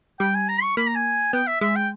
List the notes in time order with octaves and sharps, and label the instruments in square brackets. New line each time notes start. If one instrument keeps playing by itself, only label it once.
[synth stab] G3 [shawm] G5
[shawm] G#5
A#5
C#6
[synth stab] A#3 [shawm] B5
[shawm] A#5
G#5
[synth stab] B3 [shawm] G5
[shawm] E5
[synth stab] G#3 [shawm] E5
[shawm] G5